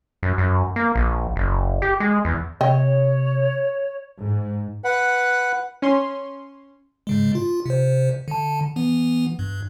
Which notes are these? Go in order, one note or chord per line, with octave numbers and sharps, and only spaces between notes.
F#2
F#2
A#3
A#1
F#1
G4
G#3
E2
C3 C#5 D#5 G5
G#2
B4 F#5
C#4 C6
G#2 C#3 G#3
F4
C3 C5
D3 A5
E3 B3
G2